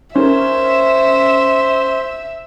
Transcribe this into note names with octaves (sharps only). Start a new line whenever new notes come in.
C#4 A#4 C5 E5